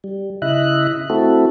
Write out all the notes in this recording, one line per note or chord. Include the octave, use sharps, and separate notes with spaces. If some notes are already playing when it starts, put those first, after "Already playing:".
G3
C#3 E4 D#5 E5 F#6
A3 C4 E4 F#4 A4